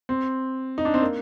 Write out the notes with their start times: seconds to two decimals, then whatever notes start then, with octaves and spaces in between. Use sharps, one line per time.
0.09 C4
0.78 D#4
0.85 D4
0.94 C4
1.01 A#3